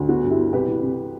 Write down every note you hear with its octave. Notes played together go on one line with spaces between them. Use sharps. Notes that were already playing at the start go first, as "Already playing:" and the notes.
Already playing: D2
B3 F#4
G2
E4 G4
B3
C2 G4 B4
E3
C3